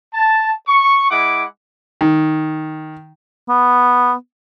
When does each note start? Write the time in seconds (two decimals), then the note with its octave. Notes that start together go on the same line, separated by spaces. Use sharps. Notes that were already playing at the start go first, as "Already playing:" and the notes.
0.14 A5
0.68 C#6
1.11 G#3 E4 F#5 D6
2.01 D#3
3.49 B3